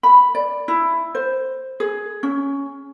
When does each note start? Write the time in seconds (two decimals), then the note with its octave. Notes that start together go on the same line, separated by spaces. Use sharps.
0.03 B5
0.35 D5
0.68 E4
1.15 C5
1.80 G#4
2.23 C#4